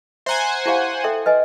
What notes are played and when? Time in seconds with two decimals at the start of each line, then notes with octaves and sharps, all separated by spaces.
0.26 C5 E5 F#5 G#5 A#5
0.66 E4 G4 F5
1.04 A4 E5 G5
1.26 B4 D#5 G#5